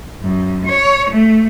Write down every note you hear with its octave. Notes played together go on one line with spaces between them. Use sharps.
F#2
C#5
A3